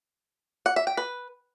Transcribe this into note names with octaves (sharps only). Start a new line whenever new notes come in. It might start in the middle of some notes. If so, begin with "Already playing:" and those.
F#5
E5
G5
B4